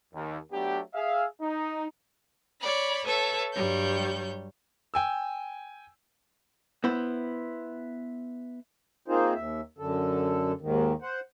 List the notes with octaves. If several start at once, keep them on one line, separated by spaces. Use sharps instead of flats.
D#2
F#3 A3 B3 D4 G4
G#4 E5 F5
D#4
C#5 D5 B5
A4 B4 C#5 E5 A5
G2 F#3 G3 C#5 G6
G5 G#5 E6
B3 E4 C5
A#3 C4 D#4 F4 G#4 C5
D#2 E5
F#2 D3 A4
D#2 G#2 D#3
C5 F#5